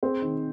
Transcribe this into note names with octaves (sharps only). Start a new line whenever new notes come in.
C4 G#4 C5
D#3